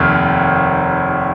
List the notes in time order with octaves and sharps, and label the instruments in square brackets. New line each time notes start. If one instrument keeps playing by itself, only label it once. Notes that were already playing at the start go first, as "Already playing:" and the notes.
Already playing: [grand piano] F1 D#2 D#3 F6